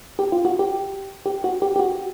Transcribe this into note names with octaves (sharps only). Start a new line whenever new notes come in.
G4
F4
F#4
G4
G4
F#4
G4
G4
F#4